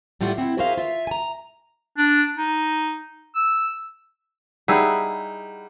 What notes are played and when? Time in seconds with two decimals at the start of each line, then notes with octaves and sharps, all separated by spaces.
0.21 A2 G3 A3 F4 F#5
0.38 C4 E4
0.58 F#4 G#4 A#4 C5 E5 F5
0.78 F4 E5
1.07 G#5 A#5
1.98 D4
2.37 D#4
3.35 E6
4.68 G3 D#4 E4 G#4 F#5 E6